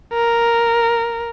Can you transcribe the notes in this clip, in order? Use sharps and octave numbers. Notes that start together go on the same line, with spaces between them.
A#4